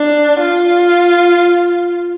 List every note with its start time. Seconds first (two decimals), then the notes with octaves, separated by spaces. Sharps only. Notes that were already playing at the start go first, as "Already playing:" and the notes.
Already playing: D4
0.40 F4